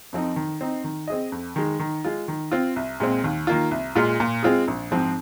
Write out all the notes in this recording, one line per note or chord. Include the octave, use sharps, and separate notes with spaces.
F2 F3 C4 D#4
D#3
C4 D#4
D#3
C4 G#4 D#5
F2
D#3 G#3
D#3
G#3 F4
D#3
C4 F4
C2
A#2 G#3 C4
D#2
D#3 A#3 F4
C2
A#2 G#3 F4
A#2
G#3 C4 F4 G#4
A#1
G#2 F3 C4